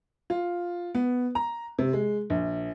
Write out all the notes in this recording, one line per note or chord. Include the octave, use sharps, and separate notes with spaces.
F4
B3
A#5
C3
G#3
A#1